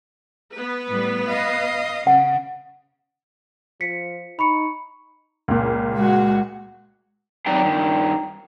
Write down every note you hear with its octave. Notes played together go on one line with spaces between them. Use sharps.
B3 B4
A2 G3
D#5 F5
C#3 F#5
F3 B6 C#7
D#4 B5 C#6 C#7
C#2 A#2
G#3 F#4
C3 F#3 D#4 B4 D5 G5
G2 D#3